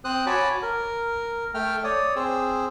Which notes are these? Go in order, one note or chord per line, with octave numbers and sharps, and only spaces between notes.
C4 C5 D#6 F#6
F#4 C#5 G#5 A5 B5 D6
A#4
A3 G5 F6
C#5 D5 D#6
C4 G#4 C5 E6